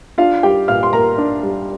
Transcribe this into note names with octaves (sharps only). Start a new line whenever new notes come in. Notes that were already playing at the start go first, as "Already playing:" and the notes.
D4 F4 F5
G3 G4 G5
A#2 F5 F6
C6
A#3 A#4 A#5
D4
G3